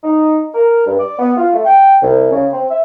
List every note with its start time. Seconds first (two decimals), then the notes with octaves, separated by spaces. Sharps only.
0.03 D#4
0.55 A#4
0.87 G2
0.99 D5
1.19 B3
1.37 F4
1.54 A3
1.65 G5
2.02 C2
2.32 C#3
2.52 C4
2.70 E5